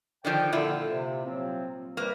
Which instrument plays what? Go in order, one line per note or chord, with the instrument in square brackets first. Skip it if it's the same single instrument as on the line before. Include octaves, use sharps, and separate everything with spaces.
[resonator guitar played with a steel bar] D3 D#3 F3 [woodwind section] D5 G5
[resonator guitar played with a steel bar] A#2 E4 F4 [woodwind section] D3
[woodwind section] C3
F3 F#3 C4
[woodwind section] C3 G3 B4 [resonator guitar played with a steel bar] A#3